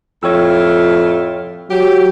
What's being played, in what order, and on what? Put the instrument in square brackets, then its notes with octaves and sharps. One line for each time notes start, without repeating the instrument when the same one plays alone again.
[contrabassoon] F2 [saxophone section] A2 F4 E5 [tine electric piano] C#5 G5 E6
[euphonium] F#3 [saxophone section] G4